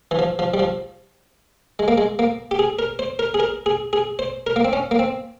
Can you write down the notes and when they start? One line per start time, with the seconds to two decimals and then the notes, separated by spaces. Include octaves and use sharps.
0.11 E3
0.19 F3
0.39 F3
0.54 G3
0.59 F3
1.79 G#3
1.88 A#3
1.98 G#3
2.19 A#3
2.51 G4
2.59 G#4
2.79 A#4
2.99 C5
3.19 A#4
3.34 G#4
3.40 A#4
3.66 G#4
3.93 G#4
4.19 C5
4.47 A#4
4.56 A#3
4.65 C4
4.73 C#4
4.91 A#3
4.99 C4